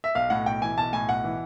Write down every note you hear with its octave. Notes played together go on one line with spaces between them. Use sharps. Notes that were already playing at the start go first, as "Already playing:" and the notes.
E5
B1 F5
A2 F#5
B1 G5
E3 G#5
B1 A5
A2 G#5
B1 F#5
E3